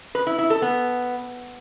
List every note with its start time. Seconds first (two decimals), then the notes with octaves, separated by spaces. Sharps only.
0.15 B4
0.27 E4
0.38 E4
0.50 A4
0.62 B3